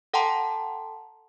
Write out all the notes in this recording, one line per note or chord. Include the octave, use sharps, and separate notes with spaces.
A4 F#5 G5 A5 A#5 C6